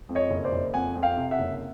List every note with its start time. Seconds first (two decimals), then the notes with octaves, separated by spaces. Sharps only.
0.09 F2
0.15 C#5 D#5
0.30 F#1
0.44 C5 D5
0.52 F#1
0.73 F2 F#5 G#5
0.95 F2
1.02 F5 G5
1.17 C3
1.31 E5 F#5
1.39 F#1